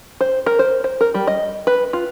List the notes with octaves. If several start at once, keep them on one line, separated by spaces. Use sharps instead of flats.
C5
A#4
C5
C5
A#4
G3
D#5
B4
F4